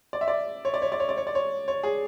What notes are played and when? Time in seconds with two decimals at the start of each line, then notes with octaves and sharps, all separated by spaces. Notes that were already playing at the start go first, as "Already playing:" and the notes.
0.13 D5
0.21 E5
0.28 D5
0.65 C#5
0.74 D5
0.82 C#5
0.92 D5
1.00 C#5
1.09 D5
1.17 C#5
1.27 D5
1.35 C#5
1.68 C#5
1.83 G#4